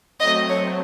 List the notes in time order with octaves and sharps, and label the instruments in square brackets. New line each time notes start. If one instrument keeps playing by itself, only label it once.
[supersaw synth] F#3 A3 C4 [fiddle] D#5
[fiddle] C#5